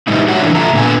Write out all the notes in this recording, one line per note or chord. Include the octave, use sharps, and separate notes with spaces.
E3 G3 G#3 D#4 E4
F#4 C#5 D5 E5 F#5
E3 A3 D4 E4
F4 A4 E5 A5 A#5
A#2 D3 B3 G#5